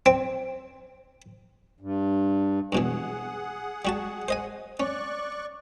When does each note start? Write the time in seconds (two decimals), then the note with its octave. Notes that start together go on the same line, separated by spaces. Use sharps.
0.06 C4
1.80 G2
2.72 G2 B2 E3 G#4 F#5
3.85 G3 F#4 A5
4.28 C5 D#5 G#5
4.80 C#4 D5 C#6 F#6